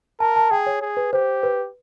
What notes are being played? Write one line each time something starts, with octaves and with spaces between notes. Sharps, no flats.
A#4 A5
A5
G#4 G5
C#5
G#4
B4
G4 C5
B4